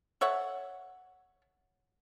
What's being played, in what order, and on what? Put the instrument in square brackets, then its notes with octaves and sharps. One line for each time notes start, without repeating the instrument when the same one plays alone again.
[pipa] A4 C#5 E5 F#5